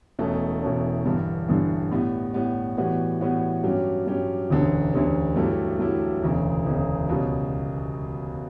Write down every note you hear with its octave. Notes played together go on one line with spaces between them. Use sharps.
E1 E2 B2 A3 C#4
E1 E2 B2 A3 C#4
A1 G2 D3 G3
A1 G2 D3 G3
A2 G3 B3
A2 G3 B3
A2 E3 G3 B3 F#4
A2 E3 G3 B3 F#4
G2 F#3 C#4 G4
G2 F#3 C#4 G4
E1 D2 D3 G3 C#4
E1 D2 D3 G3 C#4
G2 F#3 A3 E4 G4
G2 F#3 A3 E4 G4
E1 D2 C#3
E1 D2 C#3
C#2 B2 G3 C#4